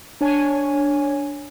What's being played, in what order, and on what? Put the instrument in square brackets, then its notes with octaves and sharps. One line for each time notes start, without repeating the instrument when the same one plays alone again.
[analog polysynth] D4 C#5 G#5